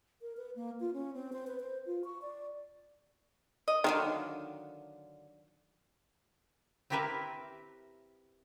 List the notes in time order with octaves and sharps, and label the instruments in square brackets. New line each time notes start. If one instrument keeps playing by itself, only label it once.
[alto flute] A#4
B4
A#3
F4
C#4
C4
C5
B4
C5
F4
C#6
D5
[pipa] D#5
[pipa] D3 F#3 F5 [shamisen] D#3
[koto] C4 E4 G4 A#4 B4 E5